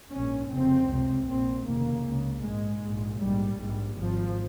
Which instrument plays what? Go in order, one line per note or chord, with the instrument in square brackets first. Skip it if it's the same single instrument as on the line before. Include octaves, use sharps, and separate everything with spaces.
[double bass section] A#1 G#2 C#4
F1 F2 C#3 C4
C#2 C3
A#1 A#2 C4
F1 D#2 C#3 A#3
C#2 C#3
A#1 G#2 G#3
A#1 G#2
A#1 G#2 G3
A#1 G#2
G#1 G#2 F3